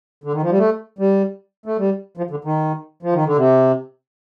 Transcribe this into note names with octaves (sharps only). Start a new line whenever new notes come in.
D3
D#3
F3
G3
A3
G3
A3
G3
F3
D3
D#3
F3
D#3
D3
C3